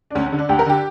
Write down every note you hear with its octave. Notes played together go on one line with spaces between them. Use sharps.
D4
D2 C#4
C#4
D3
D4
D2 G4
A#4
D3 G4